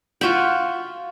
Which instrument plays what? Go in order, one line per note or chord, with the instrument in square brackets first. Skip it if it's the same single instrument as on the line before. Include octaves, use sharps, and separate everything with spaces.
[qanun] F4 F#4 E5 G5